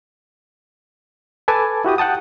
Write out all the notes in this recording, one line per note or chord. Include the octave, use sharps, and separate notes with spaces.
A4 B4 G#5 A5 D6
E4 F#4 G4 D#6
F#5 G5 A5 D#6